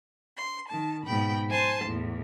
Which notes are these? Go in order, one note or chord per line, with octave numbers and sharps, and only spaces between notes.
C6
D#3 A5
G#2 B2 G5 B5
C5 G#5 A5 C6
E2 A2